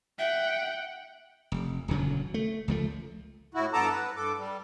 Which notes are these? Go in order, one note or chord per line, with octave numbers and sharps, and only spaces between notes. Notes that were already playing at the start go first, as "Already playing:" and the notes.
E5 F#5 G5
F1
D#1 D2 C#3 F#3
A3
C#2 F3 A3
A2 E4 F#4
G2 B3 A4 A5 A#5 D6
B4
G2 A4 D6
G3